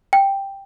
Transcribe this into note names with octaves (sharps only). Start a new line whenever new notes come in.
G5